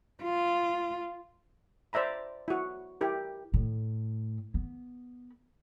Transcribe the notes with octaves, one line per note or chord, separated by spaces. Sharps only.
F4
C5 D5 E5 A#5 B5
E4 F#4
E4 G4 A#4
A2
B3